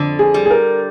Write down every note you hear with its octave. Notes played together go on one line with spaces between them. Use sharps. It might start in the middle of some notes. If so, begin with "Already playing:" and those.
Already playing: F2 D3
G#4
G3
G#4
A#4